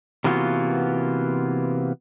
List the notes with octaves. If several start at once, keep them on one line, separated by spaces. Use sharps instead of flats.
C3 E3 A#3 B3 F4 F#4